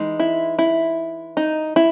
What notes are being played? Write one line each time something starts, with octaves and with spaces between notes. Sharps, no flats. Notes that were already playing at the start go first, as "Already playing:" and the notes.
Already playing: E3 G#3 D#4
E4
E4
D#4
E4